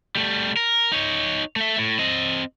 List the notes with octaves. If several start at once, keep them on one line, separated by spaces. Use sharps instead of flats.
G3 A3
A#4
D#4 C#5
A3 E5
A2
C4 D#5